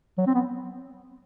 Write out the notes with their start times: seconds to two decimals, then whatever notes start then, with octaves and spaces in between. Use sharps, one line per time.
0.18 F#3
0.26 C4
0.35 B3